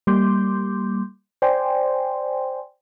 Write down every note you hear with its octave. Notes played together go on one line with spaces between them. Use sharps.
G3 A#3 C6 D6 G6
C5 D5 G5 G#5 C6